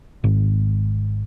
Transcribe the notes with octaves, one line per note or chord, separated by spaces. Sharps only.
G#1